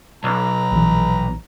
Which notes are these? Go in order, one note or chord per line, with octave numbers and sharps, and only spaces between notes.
B1 B4 A#5
A#1 E3